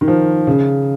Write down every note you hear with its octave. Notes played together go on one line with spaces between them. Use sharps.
D#3
F3
C#3